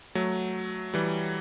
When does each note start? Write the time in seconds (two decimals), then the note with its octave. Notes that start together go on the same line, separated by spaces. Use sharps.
0.15 F#3 A3
0.94 E3 G3